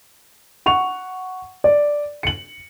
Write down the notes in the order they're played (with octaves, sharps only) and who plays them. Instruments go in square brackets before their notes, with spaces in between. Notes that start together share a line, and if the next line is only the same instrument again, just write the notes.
[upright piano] F#5 C#6 F7
D5
C#7 F#7